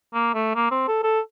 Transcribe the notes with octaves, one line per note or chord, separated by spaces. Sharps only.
A#3
A3
A#3
C4
A4
A4